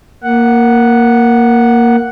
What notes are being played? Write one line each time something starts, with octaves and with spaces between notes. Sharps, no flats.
A#3 F#5